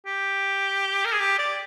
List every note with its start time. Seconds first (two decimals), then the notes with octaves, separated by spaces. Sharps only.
0.06 G4
1.05 A#4
1.12 G#4
1.20 G4
1.39 D5